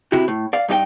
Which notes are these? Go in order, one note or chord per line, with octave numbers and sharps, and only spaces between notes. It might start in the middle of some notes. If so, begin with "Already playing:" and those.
C3 E4 F#4 G4
A2
D5 F5
G2 D#4 G4 G5